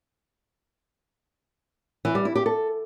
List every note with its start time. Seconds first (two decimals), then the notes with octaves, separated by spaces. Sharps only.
2.05 E3
2.15 G3
2.25 E4
2.36 G4
2.46 A4